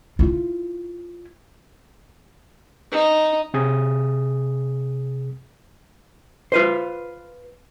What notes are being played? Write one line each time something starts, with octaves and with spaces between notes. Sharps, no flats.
E4 F4
D#4
C3 G#4 D#6
F4 B4 C5